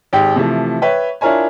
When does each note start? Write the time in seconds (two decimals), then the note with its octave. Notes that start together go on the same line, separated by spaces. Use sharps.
0.13 G#1 G4 G5
0.36 C3 E3 F3 A3
0.82 B4 C#5 E5 G5
1.21 D4 E4 F4 A#4 C#5 G#5